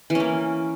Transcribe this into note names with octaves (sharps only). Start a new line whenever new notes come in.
E3 A#3 C#4